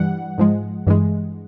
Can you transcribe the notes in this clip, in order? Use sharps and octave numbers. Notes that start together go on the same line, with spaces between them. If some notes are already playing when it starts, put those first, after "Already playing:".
Already playing: G2 E3 G3 F#5
G#2 F3 G#3
G2 E3 G#3